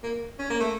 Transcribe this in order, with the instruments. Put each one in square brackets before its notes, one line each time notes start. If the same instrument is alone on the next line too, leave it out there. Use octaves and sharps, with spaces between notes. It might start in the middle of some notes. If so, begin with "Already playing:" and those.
[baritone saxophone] A#3
C#4
A#3
A3